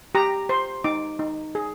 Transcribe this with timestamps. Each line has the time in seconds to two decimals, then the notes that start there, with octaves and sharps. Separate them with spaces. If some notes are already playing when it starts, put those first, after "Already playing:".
0.15 G4 A#5
0.49 C5 C6
0.84 D#4 D6
1.19 D#4
1.55 G#4